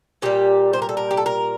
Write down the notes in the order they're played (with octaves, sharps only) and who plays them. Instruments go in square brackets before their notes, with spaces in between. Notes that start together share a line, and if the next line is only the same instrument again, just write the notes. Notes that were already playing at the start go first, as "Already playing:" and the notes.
[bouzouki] A#2 G3 G4
C5
A#4
A4
A#4
G4
A4
A#4